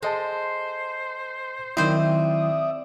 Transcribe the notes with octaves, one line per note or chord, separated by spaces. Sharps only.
G#3 A4 C5 D#5 A5
D#3 F#3 C4 E4 C5 D5 E5 D#6